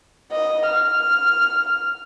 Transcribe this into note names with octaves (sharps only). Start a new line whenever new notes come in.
D#5
F6